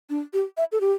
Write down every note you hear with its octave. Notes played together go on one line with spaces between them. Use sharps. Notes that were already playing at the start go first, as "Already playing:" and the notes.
D4
G4
E5
A4
G4